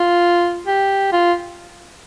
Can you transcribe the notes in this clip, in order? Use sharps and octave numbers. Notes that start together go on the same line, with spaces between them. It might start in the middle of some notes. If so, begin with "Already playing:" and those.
Already playing: F4
G4
F4